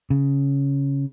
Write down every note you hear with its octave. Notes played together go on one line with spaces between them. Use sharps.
C#3